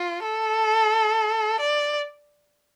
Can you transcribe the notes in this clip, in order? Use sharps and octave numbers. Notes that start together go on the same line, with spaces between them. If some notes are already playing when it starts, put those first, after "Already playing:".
Already playing: F4
A4
D5